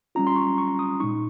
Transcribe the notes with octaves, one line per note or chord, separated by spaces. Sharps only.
G3 C#4 F4 A#5
C6
C#6
C#6
D#6
A#2 G#3 D#4 C#6